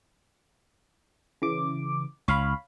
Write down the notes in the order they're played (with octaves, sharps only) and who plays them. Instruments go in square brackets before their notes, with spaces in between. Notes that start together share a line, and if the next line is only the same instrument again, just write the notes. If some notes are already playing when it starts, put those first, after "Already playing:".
[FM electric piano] C#3 E3 D6
[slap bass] C#2 [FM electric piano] C#5 F5 B5